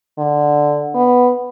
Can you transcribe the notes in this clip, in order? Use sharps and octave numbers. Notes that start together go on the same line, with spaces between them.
D3
B3